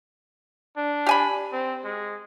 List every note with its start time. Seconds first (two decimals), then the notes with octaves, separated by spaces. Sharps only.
0.77 D4
1.06 G4 G#5 B5
1.52 C4
1.84 G#3